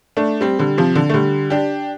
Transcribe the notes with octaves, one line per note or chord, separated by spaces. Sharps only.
A3 D4
G3 C4
D3 G3
C3 F3
D3
A3
D3 G3
D4 G4